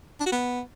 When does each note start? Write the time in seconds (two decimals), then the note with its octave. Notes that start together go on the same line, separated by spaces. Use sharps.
0.20 D4
0.26 F#4
0.32 B3